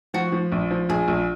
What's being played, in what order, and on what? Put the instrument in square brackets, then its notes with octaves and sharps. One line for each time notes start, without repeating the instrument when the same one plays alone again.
[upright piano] F3 [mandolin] F#4
[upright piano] F3
A#1
F3
[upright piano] A#1 [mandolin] G#4
[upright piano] A#1